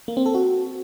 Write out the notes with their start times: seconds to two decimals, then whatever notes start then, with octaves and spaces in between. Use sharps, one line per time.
0.08 A#3
0.17 C4
0.26 A4
0.35 F#4